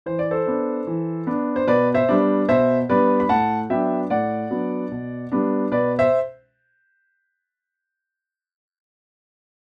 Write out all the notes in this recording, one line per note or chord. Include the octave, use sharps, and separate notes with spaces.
E3 C5
D5
A4 C5
B3 D4
E3
B3 D4
C5
B2 B4 D5
C5 E5
G3 B3 D4
B2 C5 E5
G3 B3 D4 B4 D5
B5
A2 F#5 A5
F#3 B3 D4 E5 G5
A2 D5 F#5
F#3 B3 D4
B2
G3 B3 D4
B2 B4 D5
C5 E5